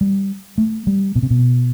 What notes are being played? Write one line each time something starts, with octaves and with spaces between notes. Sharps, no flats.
G3
A3
G3
B2
C3
B2